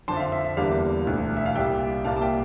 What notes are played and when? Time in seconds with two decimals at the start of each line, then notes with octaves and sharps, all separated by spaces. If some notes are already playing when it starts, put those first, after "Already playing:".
0.08 F2 D3 F3 A5 C6
0.16 E5
0.20 F5
0.32 E5
0.44 E5
0.57 E2 D3 G3 A#3 F5
1.06 E1 D2 D3
1.37 E5
1.46 F5
1.55 C2 A#2 G3 E5 G5
2.05 C2 A#2 G3 A#3 F5 A5
2.17 A5
2.21 E5 G5